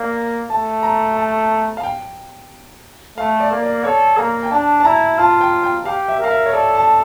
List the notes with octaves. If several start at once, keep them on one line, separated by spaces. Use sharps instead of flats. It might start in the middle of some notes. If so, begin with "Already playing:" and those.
Already playing: A#3 D5
A3 A5
A#5
A5
F5
G5
A3 F5
D5
A#3
D5
A4 C#5
A#3 A#5
G5
D4 A5
A5
E4 A#5
F4 A5
G5
G5
G4 F5
E5
A#4 F5
E5
C#5
A4 D5
A5